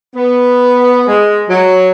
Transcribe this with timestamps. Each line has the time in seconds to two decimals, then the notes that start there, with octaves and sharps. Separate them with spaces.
0.15 B3
1.07 G#3
1.49 F#3